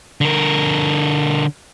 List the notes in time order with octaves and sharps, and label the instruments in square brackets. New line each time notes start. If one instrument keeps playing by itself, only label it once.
[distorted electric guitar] D3 A#4